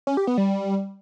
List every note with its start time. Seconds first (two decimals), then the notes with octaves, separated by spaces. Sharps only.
0.07 C#4
0.17 G4
0.27 B3
0.38 G3